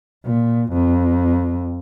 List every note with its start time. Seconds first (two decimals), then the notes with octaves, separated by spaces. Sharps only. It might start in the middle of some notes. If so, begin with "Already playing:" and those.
0.26 A#2
0.73 F2